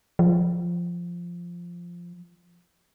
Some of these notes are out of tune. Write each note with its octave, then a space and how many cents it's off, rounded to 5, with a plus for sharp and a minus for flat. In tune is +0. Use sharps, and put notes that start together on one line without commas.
F3 -5